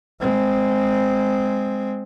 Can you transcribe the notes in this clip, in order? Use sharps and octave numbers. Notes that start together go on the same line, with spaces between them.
G#3 C4